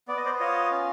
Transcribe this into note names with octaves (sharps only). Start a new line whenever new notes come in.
B3 D5
D#5
C5 D5
F4 C#5 D#5
C#4